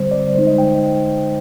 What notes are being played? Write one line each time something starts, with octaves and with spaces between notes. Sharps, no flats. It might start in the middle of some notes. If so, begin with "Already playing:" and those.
Already playing: D3 G3 C4 C5
D5
D3 G#3 D#4 C5
D#5
G5